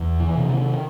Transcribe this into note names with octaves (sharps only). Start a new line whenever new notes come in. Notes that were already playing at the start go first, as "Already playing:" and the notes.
Already playing: E2
E3
C3
D#3